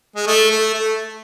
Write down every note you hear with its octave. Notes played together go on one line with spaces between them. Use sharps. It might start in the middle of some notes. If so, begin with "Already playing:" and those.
G#3
A3
A3
A3